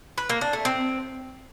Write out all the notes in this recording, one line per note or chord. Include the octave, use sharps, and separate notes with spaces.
B4
A#3
D4
A3
C4